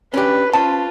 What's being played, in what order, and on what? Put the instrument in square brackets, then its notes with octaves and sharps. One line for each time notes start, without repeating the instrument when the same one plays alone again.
[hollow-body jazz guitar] C#4 D4 G4 [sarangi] B4
[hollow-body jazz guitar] C#4 C5 [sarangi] F4 [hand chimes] A5